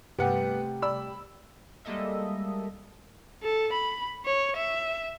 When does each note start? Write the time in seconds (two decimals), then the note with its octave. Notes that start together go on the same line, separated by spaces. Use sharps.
0.19 G2 C3 G3 A3 B3 G4 F#5 G5
0.82 D5 B5 E6
1.85 G3 G#3 A#3 A4 D#5 E5
3.43 A4
3.73 B5
4.26 C#5
4.57 E5